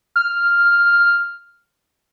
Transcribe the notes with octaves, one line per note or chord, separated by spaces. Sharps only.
F6